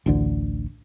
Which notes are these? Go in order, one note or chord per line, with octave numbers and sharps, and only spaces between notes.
A1 D2 D3